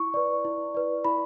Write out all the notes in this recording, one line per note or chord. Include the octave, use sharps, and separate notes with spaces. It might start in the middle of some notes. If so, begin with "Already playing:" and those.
Already playing: E4 C#6
B4 D5
E4
B4 D5
E4 B5